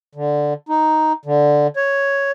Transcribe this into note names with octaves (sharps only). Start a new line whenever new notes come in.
D3
D#4
D3
C#5